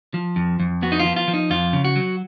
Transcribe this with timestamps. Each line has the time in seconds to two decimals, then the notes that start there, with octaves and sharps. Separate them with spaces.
0.14 F3
0.36 F2
0.60 F2
0.82 B3 F#4
0.92 D#4
1.00 F4
1.05 F3
1.16 F4
1.28 F3
1.34 D#4
1.50 F2 F4
1.73 C#3
1.85 F#4
1.96 F#3